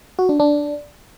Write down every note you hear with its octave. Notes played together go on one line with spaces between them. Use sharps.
F#4
D4
D4